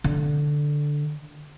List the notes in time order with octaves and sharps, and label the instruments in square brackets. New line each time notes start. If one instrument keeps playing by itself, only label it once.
[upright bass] D3